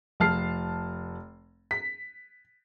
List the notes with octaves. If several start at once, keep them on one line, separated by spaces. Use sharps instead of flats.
F1 A5 F6 C7
B6